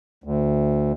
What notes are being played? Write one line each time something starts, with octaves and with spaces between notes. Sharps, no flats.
D2